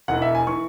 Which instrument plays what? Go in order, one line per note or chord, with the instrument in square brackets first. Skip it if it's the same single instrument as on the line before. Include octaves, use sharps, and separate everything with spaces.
[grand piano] E1 E2 E3 F#5
E5
G#5
E3 C#6